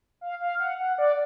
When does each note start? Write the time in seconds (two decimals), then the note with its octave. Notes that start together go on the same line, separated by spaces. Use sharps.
0.21 F5
0.41 F5
0.60 F#5
0.79 F#5
0.98 D5